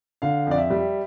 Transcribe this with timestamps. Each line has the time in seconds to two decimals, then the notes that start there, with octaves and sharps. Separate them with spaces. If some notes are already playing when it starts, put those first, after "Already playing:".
0.22 D3 F5
0.46 F2 D5
0.58 E5
0.70 G3